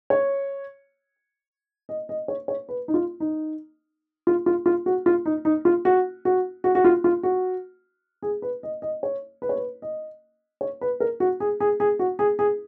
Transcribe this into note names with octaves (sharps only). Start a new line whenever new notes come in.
C#5
D#5
D#5
C#5
C#5
B4
D#4
F4
D#4
F4
F4
F4
F#4
F4
D#4
D#4
F4
F#4
F#4
F#4
F#4
F4
F4
F#4
G#4
B4
D#5
D#5
C#5
B4
C#5
B4
D#5
C#5
B4
A#4
F#4
G#4
G#4
G#4
F#4
G#4
G#4